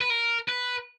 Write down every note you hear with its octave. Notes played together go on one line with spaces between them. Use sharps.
B4
A#4
B4